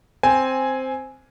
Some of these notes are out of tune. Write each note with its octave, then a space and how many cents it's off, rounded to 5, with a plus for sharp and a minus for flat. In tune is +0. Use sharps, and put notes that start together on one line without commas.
C4 +0 G#5 +0